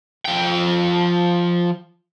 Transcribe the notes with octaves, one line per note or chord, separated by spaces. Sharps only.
F3 G5